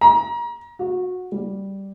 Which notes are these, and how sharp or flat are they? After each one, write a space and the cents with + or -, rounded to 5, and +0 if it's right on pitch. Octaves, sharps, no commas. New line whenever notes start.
A#5 +30
F#4 -20
G3 -5